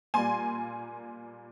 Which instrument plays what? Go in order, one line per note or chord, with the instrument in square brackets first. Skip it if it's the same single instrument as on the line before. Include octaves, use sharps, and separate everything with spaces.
[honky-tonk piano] A#2 G3 A#3 G#5 C6